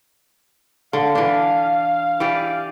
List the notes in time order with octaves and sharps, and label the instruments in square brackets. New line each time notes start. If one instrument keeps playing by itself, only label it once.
[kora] D3 [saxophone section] F5
[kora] E3 D4
E3 G4 D5